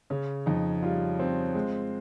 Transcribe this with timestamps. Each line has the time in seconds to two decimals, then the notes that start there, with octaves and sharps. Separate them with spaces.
0.10 C#3 C#4
0.46 F2 D#4
0.83 G3 F4
1.19 C4
1.55 G#3